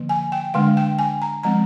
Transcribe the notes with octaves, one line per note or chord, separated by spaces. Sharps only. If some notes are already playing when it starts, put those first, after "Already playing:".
Already playing: D3 F3 A#3
G#5
G5
D3 G#3 D4 F5
G5
G#5
A#5
F3 G#3 C4 A#5